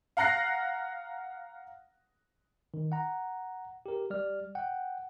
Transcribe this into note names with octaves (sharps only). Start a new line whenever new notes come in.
F5 F#5 A#5 F#6 A#6 C7
D#3
F#5 A#5
G4 A#4
G3 D5 F6
F#5 G5